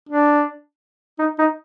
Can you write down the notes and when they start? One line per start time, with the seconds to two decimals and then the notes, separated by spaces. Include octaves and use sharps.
0.09 D4
1.19 D#4
1.38 D#4